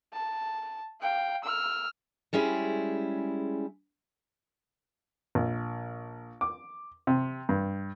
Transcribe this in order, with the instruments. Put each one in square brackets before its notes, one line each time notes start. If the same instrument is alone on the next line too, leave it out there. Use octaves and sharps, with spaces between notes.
[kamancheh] A5
F5 G5
E6 F6
[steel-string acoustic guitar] G3 G#3 C#4 E4 G#4
[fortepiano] A#1
D6
C3
G2